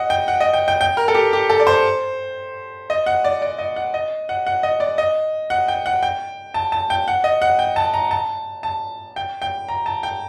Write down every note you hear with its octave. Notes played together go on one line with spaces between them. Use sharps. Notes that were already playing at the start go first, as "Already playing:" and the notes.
Already playing: D#5 F#5
G5
F#5
D#5
G5
G5
G5
A#4
A4
G4
G4
A4
D5
C5
D#5
F#5
D5
D5
D#5
F#5
D#5
F#5
F#5
D#5
D5
D#5
F#5
G5
F#5
G5
A5
A5
G5
F#5
D#5
F#5
G5
A5
A#5
A5
A5
G5
G5
A#5
A5
G5